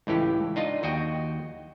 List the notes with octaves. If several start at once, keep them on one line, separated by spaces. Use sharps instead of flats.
C#2 A2 E3 G4
D4 D#4 F4 D#5
D#2 F#4 D#5 G5